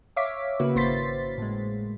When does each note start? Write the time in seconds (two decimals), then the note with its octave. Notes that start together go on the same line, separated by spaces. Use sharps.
0.16 C#5 E5 F5 D6 B6
0.59 C#3 A#3 E4 F#4 B4
0.75 G#1 A#3 C5 C6 A6 B6
1.38 A2 G#3